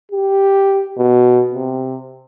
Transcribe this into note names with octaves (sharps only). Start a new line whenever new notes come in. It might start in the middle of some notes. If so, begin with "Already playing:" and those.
G4
B2
C3